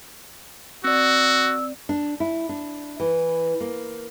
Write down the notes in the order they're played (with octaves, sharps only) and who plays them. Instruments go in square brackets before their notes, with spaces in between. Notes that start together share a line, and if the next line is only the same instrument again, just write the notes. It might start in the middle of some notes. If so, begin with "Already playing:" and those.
[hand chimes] C4 D5 [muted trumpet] F#4 [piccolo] E6
[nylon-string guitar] D4
E4
D4
E3
A#3